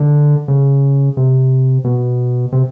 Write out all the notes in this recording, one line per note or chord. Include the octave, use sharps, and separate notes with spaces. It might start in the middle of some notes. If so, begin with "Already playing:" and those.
Already playing: D3
C#3
C3
B2
C3